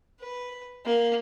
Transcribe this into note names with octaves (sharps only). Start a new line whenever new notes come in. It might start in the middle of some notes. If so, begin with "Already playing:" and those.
B4
A#3